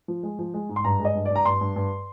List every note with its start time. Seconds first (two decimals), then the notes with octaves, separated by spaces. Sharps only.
0.08 F3
0.23 G#3
0.39 F3
0.54 G#3
0.69 G#2
0.76 C6
0.84 G2 A#5
1.00 G#3
1.05 D#5
1.15 G2
1.25 G2 D5
1.35 A#5
1.45 G2 C6
1.61 G2
1.76 G2